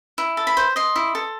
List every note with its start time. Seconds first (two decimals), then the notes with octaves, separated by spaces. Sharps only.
0.18 E4
0.37 A4
0.47 B5
0.57 C5
0.76 D#5 C6
0.96 E4
1.15 A4